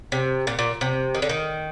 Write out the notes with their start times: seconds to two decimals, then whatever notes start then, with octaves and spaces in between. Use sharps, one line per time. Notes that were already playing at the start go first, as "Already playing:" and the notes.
0.12 C3
0.47 A#2
0.59 A#2
0.81 C3
1.15 D#3
1.22 D3
1.29 D#3